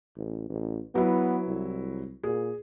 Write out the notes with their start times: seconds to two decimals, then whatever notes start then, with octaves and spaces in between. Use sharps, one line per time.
0.17 A1
0.49 A1
0.95 F#3 B3 E4
1.47 C2
2.23 A#2 G#4